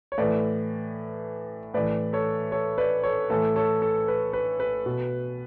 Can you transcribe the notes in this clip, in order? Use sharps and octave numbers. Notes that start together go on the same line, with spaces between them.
C#5
A2 E3 B4 D5
A2 E3 B4 D5
A4 C#5
A4 C#5
B4 D5
A4 C#5
A2 E3 A4 C#5
A4 C#5
A4
B4
B4
B4
B2